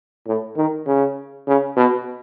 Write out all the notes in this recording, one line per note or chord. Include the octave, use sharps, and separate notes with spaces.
A2
D#3
C#3
C#3
B2